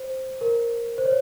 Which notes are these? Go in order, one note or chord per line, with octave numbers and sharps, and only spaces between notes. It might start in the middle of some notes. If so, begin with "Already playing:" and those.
Already playing: C5
A#4
C5
C#5